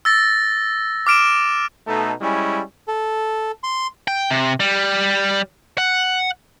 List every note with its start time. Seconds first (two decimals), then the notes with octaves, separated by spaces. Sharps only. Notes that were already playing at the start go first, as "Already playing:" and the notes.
0.05 E6 A6 A#6
1.07 D6 F6 D7 E7
1.87 B2 A3 D#4 A4
2.21 G3 G#3 C#4 E4
2.88 A4
3.63 C6
4.08 G5
4.31 C3
4.60 G3
5.78 F#5